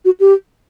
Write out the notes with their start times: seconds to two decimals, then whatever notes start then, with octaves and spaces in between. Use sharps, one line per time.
0.05 F#4
0.20 G4